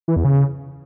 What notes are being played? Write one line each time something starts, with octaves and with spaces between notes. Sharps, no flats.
E3
E2
C#3